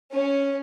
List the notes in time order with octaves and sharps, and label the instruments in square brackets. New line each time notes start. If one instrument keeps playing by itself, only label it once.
[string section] C#4